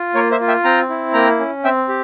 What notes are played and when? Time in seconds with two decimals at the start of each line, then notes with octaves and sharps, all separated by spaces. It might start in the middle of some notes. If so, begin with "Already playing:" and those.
Already playing: F4
0.14 A#3 A#4 C#5
0.31 C5 E5
0.40 F4
0.48 E5 G5
0.64 C4 G5 A#5
0.89 E4
1.14 A#3 G5 A#5
1.39 C#4
1.64 C4 E5 G5
1.89 G4